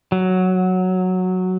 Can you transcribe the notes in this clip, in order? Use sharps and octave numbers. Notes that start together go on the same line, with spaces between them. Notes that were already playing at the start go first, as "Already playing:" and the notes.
F#3